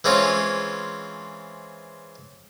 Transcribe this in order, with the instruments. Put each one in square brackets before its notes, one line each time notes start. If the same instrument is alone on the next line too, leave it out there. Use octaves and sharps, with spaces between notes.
[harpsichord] E3 G#3 C4 C#4 F4